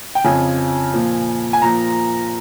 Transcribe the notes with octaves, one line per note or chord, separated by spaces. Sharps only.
G5
F2 C#3 F3 G#5
A#2 F3
G#5
A#2 F3 A#5